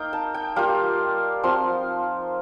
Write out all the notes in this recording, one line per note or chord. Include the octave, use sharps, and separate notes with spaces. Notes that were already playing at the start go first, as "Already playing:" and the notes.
Already playing: A#3 D#4 F5 G5
A5
G5
G3 A#3 F4 F5
F3 C4 F4 C6